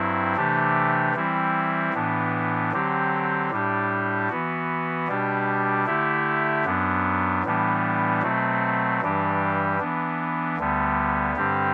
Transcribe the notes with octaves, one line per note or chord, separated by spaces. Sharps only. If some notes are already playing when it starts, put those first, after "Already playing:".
Already playing: G2 F#3 C4 E4
C3 E3 A3 D4 G4
E3 G3 C4 E4
A2 E3 B3 D4
D3 F#3 C4 G4
A2 G3 D4 G4
E3 B3 F#4
B2 G3 D4 G4
D3 A3 E4 G4
F#2 F#3 B3 D4
A2 E3 G3 B3 D4
B2 F#3 A3 C4
G2 E3 G3 D4 G4
E3 B3 D4
D2 D3 G3 B3
G2 D3 G3 C4 G4